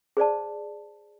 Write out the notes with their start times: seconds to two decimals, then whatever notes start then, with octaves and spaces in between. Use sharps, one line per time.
0.17 G#4 C5 D5 A5